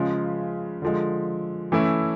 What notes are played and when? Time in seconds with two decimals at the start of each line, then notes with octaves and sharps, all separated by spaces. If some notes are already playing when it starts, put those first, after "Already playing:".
Already playing: C#3 F3 G#3
0.82 D3 F3 G#3
1.72 E3 A3 C#4 E4